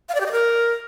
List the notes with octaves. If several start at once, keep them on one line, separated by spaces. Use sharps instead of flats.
F5
D5
G4
D#5
A#4